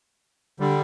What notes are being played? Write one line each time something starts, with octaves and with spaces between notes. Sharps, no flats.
D3 G3